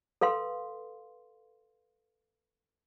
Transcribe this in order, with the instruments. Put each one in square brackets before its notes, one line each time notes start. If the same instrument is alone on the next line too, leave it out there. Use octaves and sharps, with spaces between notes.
[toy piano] A4 B4 F5 C6